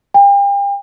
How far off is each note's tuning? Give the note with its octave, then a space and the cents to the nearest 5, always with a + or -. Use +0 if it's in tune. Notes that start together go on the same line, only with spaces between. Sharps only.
G5 +40